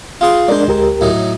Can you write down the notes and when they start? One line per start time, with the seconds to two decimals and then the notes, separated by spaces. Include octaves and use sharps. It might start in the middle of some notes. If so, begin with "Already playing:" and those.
0.21 F4 G#4 C6
0.48 G#3 D4 A#4 C5 D5
0.68 D2 G4 A#4
1.01 A2 F#3 D#4